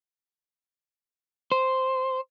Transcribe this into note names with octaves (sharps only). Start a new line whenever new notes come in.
C5